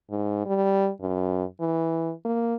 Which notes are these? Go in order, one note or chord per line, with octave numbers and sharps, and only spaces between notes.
G#2
G3
F#2
E3
A#3